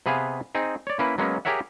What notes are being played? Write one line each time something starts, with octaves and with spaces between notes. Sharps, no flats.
C3 B3 G#4 B4 F5 G#5
C4 D#4 G#4
C#5 D5
A#3 C#4 E4 B4
F#3 G#3 A#3 B3 C#4
G4 G#4 A#4 C#5 E5 F#5